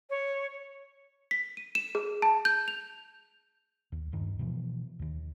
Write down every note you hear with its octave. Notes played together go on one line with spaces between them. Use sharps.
C#5
B6
D#7
E7
G#4
A5
G6
F7
D#2
D1 G2 D#3
B2 E3 F3
D#2 D#3